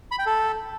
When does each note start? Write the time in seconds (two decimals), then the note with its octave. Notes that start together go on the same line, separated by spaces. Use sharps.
0.11 B5
0.19 G5
0.26 A4